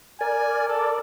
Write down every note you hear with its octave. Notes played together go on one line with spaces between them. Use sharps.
A#4 D5 G#5
A4